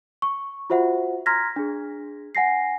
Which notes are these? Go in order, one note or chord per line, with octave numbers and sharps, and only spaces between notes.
C#6
F4 F#4 C5 E5 F#5
A#5 C6 F6 G#6 A#6 B6
D4 G#4
F#5 G#5 A#6 C7